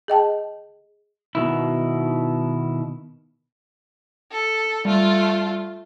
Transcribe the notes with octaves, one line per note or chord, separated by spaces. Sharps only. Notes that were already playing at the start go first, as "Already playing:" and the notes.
G#4 D#5 G5 A5
B2 D#3 E4
A4
G3 A3 F4